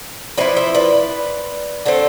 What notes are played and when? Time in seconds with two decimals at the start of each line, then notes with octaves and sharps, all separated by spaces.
0.37 F3 B3 E4 B4 D5
0.56 C5 E5
0.74 B4 D5
1.86 D3 A3 C4